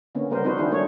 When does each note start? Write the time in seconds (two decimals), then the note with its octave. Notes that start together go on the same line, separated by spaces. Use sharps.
0.15 D3 A#3 B3 C#4
0.30 C#3 G3 B3 A#4 C5
0.44 F3 C4 D#4 F#4 B4 C5
0.57 D#3 D4 E4 G#4 C5
0.71 G3 A3 D4 C#5